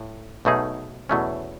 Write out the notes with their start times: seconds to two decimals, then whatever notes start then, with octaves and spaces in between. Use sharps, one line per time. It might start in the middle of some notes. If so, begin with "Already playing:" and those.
Already playing: A2
0.45 B1 B2 A3 D#4 G#4
1.09 E2 B2 F#3 A3 C#4